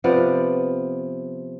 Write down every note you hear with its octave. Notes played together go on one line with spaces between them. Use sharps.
C3 F3 B3 D5